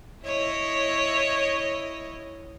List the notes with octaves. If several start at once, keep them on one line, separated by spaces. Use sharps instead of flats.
E4 C#5 D#5